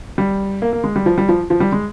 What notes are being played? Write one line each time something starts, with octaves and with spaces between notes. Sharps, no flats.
G3
A#3
A#3
G#3
G3
F3
G3
F3
F3
G3
G#3